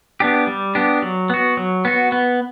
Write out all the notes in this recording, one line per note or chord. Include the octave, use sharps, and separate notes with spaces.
B3 D4 G4
G3
B3 D4 G4
F#3
B3 F#4
F#3
B3 F#4
B3